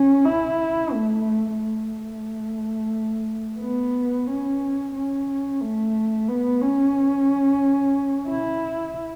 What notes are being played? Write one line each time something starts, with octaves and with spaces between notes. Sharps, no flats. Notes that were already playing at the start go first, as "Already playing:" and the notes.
Already playing: C#4
E4
A3
A3
B3
C#4
C#4
A3
B3
C#4
E4